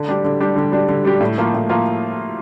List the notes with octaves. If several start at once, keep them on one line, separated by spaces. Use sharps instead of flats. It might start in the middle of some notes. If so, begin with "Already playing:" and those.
Already playing: D3
G3 D4 G4
D3
G3 D4 G4
D3
G3 D4 G4
D3
G3 D4 G4
A2
F3 A#3 F4
A2
F3 A#3 F4